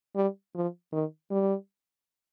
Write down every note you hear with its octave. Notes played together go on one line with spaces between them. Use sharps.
G3
F3
D#3
G3